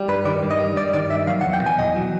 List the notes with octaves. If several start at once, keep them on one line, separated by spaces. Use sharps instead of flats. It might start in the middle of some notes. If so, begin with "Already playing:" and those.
Already playing: G3
G2 B4
D#3 D5
G2
D#5
G3
G2 D5
D#3 D5
G2 E5
F#3 F5
F#5
E2
G5
B2 G#5
E2 D#5
F#3